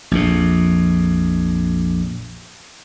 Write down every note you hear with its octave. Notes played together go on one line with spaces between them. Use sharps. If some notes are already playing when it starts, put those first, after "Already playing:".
A#1 F2 A#2